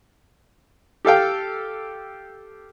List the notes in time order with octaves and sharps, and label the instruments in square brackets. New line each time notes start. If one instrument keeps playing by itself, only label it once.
[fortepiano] G4 A4 F5 G5